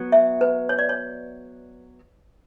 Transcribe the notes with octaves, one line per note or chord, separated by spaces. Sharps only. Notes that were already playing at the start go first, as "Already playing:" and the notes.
Already playing: F#3 B3
E5
B4
C#5
D5
C#5